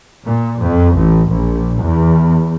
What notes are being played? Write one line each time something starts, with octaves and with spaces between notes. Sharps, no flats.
A#2
F2
A1
A#1
E2